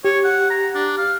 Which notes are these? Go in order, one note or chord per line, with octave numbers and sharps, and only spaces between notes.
G4 C#5
F#5
A#5
D4
F5